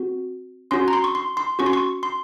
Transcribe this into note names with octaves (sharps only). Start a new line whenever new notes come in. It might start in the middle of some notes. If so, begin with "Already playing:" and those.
Already playing: C4 F#4
C#4 F#4 C6
A#5
C6
C#6
C6
C6
C#4 F#4 C#6
C6
C#6
C6